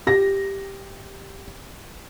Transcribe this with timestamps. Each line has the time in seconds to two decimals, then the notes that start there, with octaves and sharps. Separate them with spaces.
0.07 G4 A#6